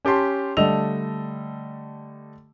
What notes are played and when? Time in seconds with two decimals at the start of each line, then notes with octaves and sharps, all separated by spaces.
0.05 C#4 G4 A5 C6
0.57 D3 G3 A3 D#5 E6 F7